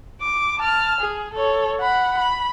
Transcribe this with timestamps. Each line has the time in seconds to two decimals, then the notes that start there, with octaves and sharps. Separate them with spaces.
0.21 D6
0.59 A5 F6
1.01 G#4
1.34 A4 C#5
1.81 F#5 B5
2.18 B5